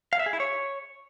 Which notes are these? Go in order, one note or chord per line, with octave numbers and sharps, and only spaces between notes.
F5
E5
G#4
E4
C#5